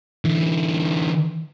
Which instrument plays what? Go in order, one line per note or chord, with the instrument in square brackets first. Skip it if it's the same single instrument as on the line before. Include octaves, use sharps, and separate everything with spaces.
[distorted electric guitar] D3 E3